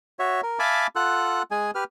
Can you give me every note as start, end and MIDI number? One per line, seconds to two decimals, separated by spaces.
0.19 0.41 66
0.19 0.41 73
0.19 0.41 76
0.43 0.59 70
0.59 0.87 76
0.59 0.87 77
0.59 0.87 80
0.59 0.87 81
0.59 0.87 83
0.59 0.87 86
0.96 1.42 65
0.96 1.42 69
0.96 1.42 78
0.96 1.42 90
1.51 1.71 56
1.51 1.71 68
1.51 1.71 80
1.75 1.84 67
1.75 1.84 71
1.75 1.84 89